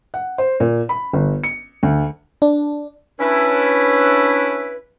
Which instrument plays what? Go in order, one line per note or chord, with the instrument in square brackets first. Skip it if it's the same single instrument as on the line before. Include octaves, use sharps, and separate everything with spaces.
[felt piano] F#5
C5
A#2
B5
G1
C#7
D2
[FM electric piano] D4
[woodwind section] C#4 D4 E4 B4